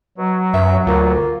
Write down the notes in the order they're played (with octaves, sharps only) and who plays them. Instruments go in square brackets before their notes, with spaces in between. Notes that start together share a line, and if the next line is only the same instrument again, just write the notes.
[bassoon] B2 [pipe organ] F#3
[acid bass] F#2 [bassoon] B3 [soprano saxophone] E5
[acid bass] D2 [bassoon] A#3 [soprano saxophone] F4